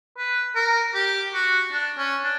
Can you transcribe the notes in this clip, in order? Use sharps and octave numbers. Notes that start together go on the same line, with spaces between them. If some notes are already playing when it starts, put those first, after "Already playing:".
B4
A#4
G4
F#4
D4
C#4
D4